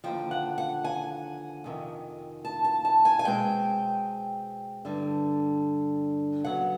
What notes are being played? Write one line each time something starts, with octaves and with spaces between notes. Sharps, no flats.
D#2 D3 F3 G5
F#5
F#5
G#5
F2 C3 D#3
A5
A5
A5
G#5
G#5
B2 G#3 C4 G5
G2 D3 G3
C#3 F#3 B3 F#5